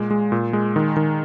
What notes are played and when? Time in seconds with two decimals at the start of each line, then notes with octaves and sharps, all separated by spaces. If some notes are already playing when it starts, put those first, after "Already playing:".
Already playing: A#2 G#3
0.11 G#3
0.32 A#2
0.53 G#3
0.76 D#3
0.97 D#3